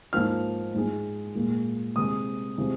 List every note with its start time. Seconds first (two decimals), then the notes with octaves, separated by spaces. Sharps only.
0.13 G#2 F3 A#3 F6
0.74 G#2 G#3
1.35 A#2 G#3
1.96 C3 G#3 D#6
2.58 C3 F3 G#3